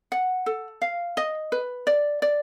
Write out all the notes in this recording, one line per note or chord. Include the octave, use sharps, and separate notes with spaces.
F#5
A4
F5
D#5
B4
D5
D5